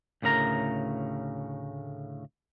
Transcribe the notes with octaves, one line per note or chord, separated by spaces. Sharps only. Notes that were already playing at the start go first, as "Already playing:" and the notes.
D2 A2 C#3 A#4 A#5